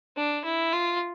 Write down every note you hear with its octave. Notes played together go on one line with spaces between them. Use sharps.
D4
E4
F4